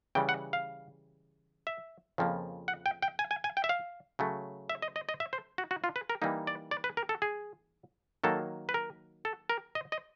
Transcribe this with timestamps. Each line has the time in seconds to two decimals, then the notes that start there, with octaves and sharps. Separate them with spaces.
0.15 C#3 E3 G3 G5
0.29 F#5
0.53 F5
1.67 E5
2.18 F2 C#3 F3 A#3
2.68 F#5
2.86 G5
3.02 G5
3.19 G#5
3.31 G#5
3.44 G#5
3.57 G5
3.64 E5
3.69 F5
4.19 C#3 F#3 A3
4.70 E5
4.82 D#5
4.96 D#5
5.09 D#5
5.20 E5
5.33 C5
5.58 F#4
5.71 F#4
5.84 F4
5.96 B4
6.10 A#4
6.22 E3 G3 A#3 D#4
6.47 D5
6.71 D5
6.84 B4
6.97 A#4
7.09 A4
7.22 G#4
8.24 D#3 F#3 A#3 A4
8.69 B4
8.74 A#4
9.25 A4
9.49 A#4
9.75 D#5
9.92 D#5